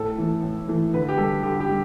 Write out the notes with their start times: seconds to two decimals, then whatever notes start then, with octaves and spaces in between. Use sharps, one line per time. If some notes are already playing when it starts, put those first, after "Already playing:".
Already playing: A2 A4
0.18 E3 A3
0.43 A2
0.68 E3 A3
0.94 D3 B4
1.08 G4
1.18 G3 A4
1.43 D3 G4
1.60 G4
1.69 G3